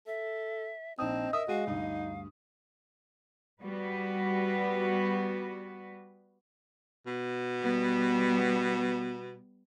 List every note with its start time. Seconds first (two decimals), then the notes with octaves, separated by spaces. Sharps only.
0.07 A4 E5
0.99 A#1 C4 D#4 D#5 A5 D#6
1.33 A#4 E5 D#6
1.48 G#3 F#4 F5 D#7
1.67 D2 G2 D#4
3.61 G3 B3 F#4 B4
7.07 B2
7.62 G3 B3